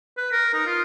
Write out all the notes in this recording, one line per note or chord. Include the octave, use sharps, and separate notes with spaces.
B4
A#4
D#4
F4